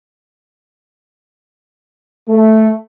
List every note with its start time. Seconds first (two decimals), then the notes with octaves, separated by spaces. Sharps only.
2.29 A3